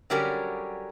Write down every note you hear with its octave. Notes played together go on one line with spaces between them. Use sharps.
D3 F#3 G3 C#4 G4 A#4